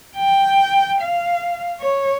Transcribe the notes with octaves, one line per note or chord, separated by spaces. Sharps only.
G5
F5
C#5